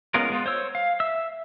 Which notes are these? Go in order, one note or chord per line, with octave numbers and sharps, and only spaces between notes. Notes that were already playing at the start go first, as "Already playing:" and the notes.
G#3 B3 C#4 F4 A#4
G#3 B3 F4
C5 C#5 E6
F5
E5 E6